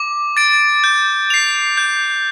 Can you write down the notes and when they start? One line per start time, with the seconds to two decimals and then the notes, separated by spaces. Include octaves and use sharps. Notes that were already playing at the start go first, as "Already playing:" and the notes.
Already playing: D6
0.37 A6 D7
0.84 G6
1.30 C7 F7
1.77 G6